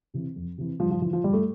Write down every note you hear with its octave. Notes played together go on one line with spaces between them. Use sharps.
C3 E3
F2
C3 E3
G2 F3
F3
E3 F3
F3
G2 G3
A3